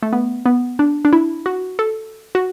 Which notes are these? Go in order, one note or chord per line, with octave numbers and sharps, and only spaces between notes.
A3
B3
B3
D4
D4
E4
F#4
A4
F#4